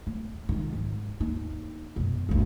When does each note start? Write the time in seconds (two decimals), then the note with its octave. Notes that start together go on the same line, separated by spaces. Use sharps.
0.07 D1
0.49 D#3 F#3
0.73 G#2
1.20 D#2 D#4
1.96 F#2 B2
2.29 G#1 D2